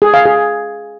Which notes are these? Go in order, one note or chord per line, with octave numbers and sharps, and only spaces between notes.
G#4
F5
G#4